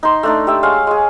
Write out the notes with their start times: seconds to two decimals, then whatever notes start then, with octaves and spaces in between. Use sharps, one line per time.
0.03 D#4 C6
0.23 A3 D4 D#4
0.47 G4 E5
0.63 G#3 C#5 F5
0.87 G#3 G#4